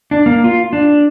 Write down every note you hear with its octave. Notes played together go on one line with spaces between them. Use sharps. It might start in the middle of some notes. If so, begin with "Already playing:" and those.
D4
A#3
F4
D4